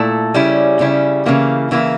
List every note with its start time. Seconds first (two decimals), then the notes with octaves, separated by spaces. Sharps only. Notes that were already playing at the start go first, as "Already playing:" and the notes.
Already playing: A#2 A3 E4 A4
0.34 C#3 G3 C#4 E4
0.80 C#3 G3 C#4 E4
1.26 C#3 E3 A#3 E4
1.71 C#3 E3 A#3 E4